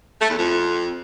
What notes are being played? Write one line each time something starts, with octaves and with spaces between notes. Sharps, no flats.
A3
E2
F2